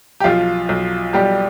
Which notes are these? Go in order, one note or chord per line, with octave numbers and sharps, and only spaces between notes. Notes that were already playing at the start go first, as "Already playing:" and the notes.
G4
B1 F3 F4
B1
B1 G3 G4